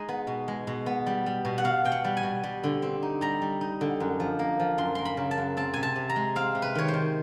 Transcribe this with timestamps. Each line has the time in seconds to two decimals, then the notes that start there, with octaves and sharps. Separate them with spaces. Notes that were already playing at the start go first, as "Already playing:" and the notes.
Already playing: G#3 D#4 D#5
0.09 B3
0.27 B2
0.48 G#3
0.67 B2
0.86 B3
1.06 G3
1.26 G3
1.45 B2
1.58 F#5
1.64 B2 F5
1.85 B2 G5
1.92 F#5
2.04 G3
2.17 G#5
2.23 B2
2.43 G3
2.64 D3
2.82 C4
3.02 D#4
3.21 G3 A#5
3.42 G3
3.61 D#4
3.81 D3
4.00 F#2
4.20 F3
4.39 A#3
4.60 F3
4.78 F#2 C6
4.95 A#3 C6
5.05 B5
5.17 C#3
5.31 A5
5.38 F#2
5.57 C4 A5
5.74 C3 G#5
5.83 A5
5.96 C3
6.10 A#5
6.16 G#3
6.36 C4 F5
6.55 C3
6.62 B4
6.75 D#3 C#5
6.88 C5
6.94 D#3